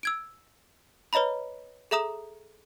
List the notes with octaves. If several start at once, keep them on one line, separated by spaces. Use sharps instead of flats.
E6 G#6 D7
B4 C#5 D#5 A#5 B5
G#4 A4 E5 A#5 D#6 E7